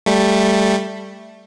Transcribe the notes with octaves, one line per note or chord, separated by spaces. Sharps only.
G3 A3